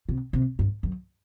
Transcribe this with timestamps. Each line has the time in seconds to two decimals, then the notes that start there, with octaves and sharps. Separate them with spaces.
0.09 C3
0.33 C3
0.59 G2
0.83 F#2